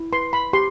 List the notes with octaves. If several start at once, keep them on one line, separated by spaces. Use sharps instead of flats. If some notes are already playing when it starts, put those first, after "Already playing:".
Already playing: E4
B4 C6
B5
G4 C6